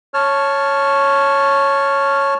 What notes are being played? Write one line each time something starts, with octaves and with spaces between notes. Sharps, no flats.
C#5 A5 F6